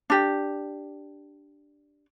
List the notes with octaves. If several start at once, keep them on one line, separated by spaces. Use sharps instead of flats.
D4 G4